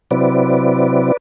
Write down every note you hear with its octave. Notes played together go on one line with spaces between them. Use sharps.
C3 F#3 C4 E4 B4 D5